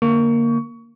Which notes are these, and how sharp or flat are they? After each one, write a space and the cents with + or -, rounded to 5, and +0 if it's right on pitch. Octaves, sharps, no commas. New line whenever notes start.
D3 +0 A#3 +0 C#6 +25